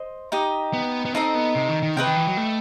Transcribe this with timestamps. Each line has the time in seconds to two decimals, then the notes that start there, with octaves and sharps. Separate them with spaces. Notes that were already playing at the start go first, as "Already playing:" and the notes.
Already playing: C5 D#5 C6
0.32 D#4 G4 D#5
0.73 B3
1.05 B3
1.14 C4 D#4 A4 D#5
1.35 B3
1.55 C3
1.69 D#3
1.83 D#3
1.96 C3 B4 D#5 G5
2.07 D#3
2.16 E3
2.27 F#3
2.37 A3